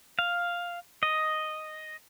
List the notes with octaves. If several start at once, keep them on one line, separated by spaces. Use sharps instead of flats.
F5
D#5